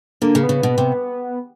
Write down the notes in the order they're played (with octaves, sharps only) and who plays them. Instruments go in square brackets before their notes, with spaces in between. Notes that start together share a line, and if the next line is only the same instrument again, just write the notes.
[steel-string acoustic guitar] D3 [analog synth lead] A#3
[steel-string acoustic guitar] C#3
[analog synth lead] B3
[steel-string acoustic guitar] C#3
B2
C3